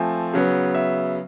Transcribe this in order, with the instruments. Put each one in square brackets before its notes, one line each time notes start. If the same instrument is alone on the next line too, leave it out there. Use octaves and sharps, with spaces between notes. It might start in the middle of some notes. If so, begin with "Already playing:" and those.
Already playing: [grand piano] F3 A3 C4 G#5
C#3 F#3 B3
E5